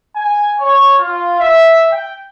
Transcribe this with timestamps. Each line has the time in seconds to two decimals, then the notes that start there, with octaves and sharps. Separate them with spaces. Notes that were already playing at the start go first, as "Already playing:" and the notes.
0.15 G#5
0.59 C#5
0.98 F4
1.40 E5
1.92 G5